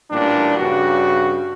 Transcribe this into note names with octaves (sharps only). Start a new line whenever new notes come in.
A1 A#2 G3 D4
G2 C#3 F#4